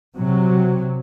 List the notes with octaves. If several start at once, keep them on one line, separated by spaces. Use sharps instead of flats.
C3 F#3